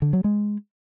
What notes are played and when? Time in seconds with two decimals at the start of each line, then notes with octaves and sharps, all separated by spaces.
0.02 D3
0.13 F#3
0.24 G#3